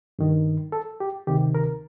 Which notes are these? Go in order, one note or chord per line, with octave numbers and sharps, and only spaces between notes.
G2 D#3
A4
G4
D2 C3 D#3 G4
A#4